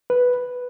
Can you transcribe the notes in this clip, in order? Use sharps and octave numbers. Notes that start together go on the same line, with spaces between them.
B4